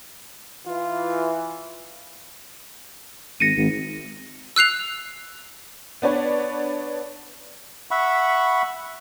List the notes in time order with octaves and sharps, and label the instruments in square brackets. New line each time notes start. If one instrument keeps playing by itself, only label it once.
[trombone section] E3 [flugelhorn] F4
[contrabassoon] G#1 [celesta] A#6 C#7 D#7
[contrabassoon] G#1
[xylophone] E6 F#6 C7 F7
[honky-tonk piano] B3 D4 B4 C#5
[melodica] E5 F#5 B5 C#6